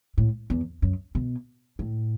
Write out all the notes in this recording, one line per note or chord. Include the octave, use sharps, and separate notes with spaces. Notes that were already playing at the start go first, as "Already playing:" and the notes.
A2
E2
F#2
B2
A2